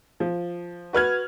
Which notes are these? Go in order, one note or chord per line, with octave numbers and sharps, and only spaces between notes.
F3
F#4 B4 F6 G#6